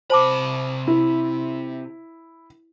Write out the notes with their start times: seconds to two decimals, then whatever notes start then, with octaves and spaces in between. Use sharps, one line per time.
0.10 C3 C5 A5 B5 D6
0.87 E4